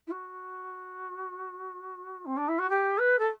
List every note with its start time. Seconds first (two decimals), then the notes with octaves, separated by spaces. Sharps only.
0.07 E4
0.11 F#4
2.25 C4
2.37 D4
2.48 E4
2.58 F#4
2.69 G4
2.98 B4
3.18 A4